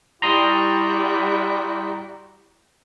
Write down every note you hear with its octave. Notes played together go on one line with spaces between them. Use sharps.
G3 E4 F#4 A#5 C6 D#6